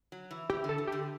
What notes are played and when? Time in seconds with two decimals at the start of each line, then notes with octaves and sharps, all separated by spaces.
0.12 F#3
0.31 E3
0.50 E3 G4
0.64 D3 A4
0.78 E3
0.87 G4
0.92 D3